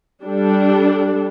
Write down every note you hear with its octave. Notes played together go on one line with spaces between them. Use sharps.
G3 D4 A4